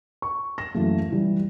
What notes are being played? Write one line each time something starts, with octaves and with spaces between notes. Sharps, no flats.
C#6
A#6 E7
F#2 E3 A3 A#3
E3 G3